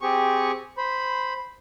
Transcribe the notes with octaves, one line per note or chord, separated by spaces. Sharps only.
C4 G4 G#4 C#6
C5 B5